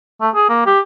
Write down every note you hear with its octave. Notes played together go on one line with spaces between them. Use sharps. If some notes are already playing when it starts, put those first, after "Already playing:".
A3
G#4
A#3
G4